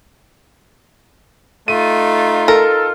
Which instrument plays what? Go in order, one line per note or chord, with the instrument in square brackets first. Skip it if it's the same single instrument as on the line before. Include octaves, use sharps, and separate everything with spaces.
[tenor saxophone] A3 [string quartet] D#4 F4 [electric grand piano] D#7
[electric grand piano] A4 [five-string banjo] A#4